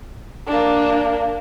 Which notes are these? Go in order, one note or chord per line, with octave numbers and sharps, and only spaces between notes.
A#3 D4